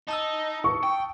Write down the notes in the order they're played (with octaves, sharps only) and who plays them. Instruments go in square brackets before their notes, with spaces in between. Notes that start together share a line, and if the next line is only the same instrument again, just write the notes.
[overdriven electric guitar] D#4 [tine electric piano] A5 D#6 E6
[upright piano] C#6
[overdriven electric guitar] G5